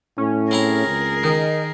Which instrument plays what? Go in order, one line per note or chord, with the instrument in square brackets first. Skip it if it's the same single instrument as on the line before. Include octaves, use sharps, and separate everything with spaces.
[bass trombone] A2 [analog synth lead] C#4
[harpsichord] C4 E4 A#5 [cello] G#4 A#4
[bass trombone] C#2
[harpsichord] D#3 [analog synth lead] D#4